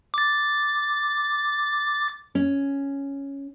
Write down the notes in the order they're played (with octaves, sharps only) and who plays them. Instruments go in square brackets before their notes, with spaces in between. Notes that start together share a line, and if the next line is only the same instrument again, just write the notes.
[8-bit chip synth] D6 A6
[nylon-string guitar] C#4